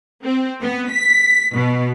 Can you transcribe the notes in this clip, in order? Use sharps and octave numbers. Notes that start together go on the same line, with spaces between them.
C4
B3
B6
B2